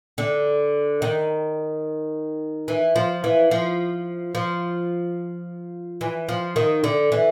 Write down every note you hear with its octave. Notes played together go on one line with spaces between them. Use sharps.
D3
D#3
E3
F3
E3
F3
F3
E3
F3
D#3
D3
E3